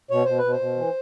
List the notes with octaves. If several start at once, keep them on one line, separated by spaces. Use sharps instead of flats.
B2 C#5
B2 C5
B4
B2
C5
B2
E3